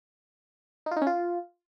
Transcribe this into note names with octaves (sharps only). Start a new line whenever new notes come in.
D#4
F4
D#4
C#4
F4